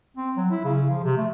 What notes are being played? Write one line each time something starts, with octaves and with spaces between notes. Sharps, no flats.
C4
F#3
E4
C#3
F3
C3
A3